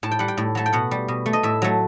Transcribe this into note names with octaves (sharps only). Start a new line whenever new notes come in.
A2 A5
G5
G3 F#5
G5
A2
F#3 A3 A5
G5
B2 F#5
G3
B2
A3
D#5
A2 E5
F#3 A3